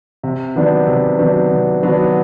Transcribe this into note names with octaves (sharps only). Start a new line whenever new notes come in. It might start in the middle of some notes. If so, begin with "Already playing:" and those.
C3
D#3 F#3 B3 D4
C3
D#3 F#3 B3 D4
C3
D#3 F#3 B3 D4